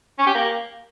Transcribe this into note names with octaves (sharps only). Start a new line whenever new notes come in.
C#4
G4
A#3